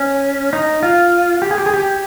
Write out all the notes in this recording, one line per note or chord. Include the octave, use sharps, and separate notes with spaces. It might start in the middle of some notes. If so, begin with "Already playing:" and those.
Already playing: C#4
D#4
F4
G4
G#4
G4
G#4
G4